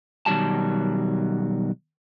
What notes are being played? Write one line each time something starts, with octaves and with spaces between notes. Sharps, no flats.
B2 D#3 F#3 G3 A5